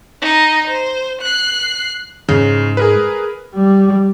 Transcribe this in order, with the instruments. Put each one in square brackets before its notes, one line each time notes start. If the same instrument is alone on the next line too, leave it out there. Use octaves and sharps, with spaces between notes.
[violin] D#4 D#5
C5
F#6 C7
[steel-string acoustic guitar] G#2 [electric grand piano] C#3
[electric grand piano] G#4 A#4 B4
[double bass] G3